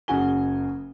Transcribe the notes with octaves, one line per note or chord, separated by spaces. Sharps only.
F#1 C#3 F#4 G#5 G7